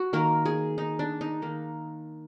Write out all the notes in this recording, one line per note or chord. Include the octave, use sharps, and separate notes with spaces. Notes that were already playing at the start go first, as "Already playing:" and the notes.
Already playing: F#4
D#3 A#3 A#4
G#4
D#4
D4
D#4
D#3 A#3